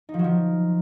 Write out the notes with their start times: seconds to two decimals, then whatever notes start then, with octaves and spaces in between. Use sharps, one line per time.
0.09 D#4
0.14 F3
0.19 F#3
0.24 F3